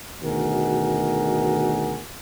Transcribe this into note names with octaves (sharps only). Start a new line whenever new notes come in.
D2 B2 D#3 F#4 G#4 A#4